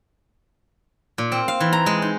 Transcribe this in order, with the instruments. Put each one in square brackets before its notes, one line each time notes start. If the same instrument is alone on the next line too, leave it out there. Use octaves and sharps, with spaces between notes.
[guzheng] A#2
C4
F5
E3
A#5
G#3
D#4